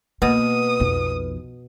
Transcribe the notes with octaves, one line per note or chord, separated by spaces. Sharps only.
B2 A#3 B4 D#6
B1 F2